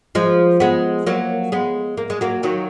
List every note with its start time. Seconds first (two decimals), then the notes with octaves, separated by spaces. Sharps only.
0.15 F3 G#3
0.60 G#3 B3
1.06 F#3 A#3
1.52 G#3 B3
1.97 A#3
2.10 G#3
2.21 F#3 A#3
2.43 D#3 F#3